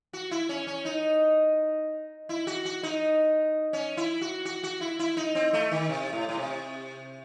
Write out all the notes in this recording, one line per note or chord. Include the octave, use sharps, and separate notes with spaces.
F#4
E4
C#4
C#4
D#4
E4
F#4
F#4
D#4
C#4
E4
F#4
F#4
F#4
E4
E4
D#4
C4
A3
D#3
C3
A2
A2
C3